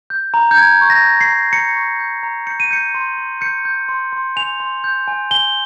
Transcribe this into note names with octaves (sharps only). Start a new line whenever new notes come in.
G6
A#5
G6
A#5 G#6
C#6
A#6
G6
C7
A#5
A#5 C#7
C#6
G6
A#5
G6 C#7
D#7
G6 C#7
C6
C6
G6 C#7
G6
C6
C6
G#5 F7
C6
G6
G#5
G#5 G7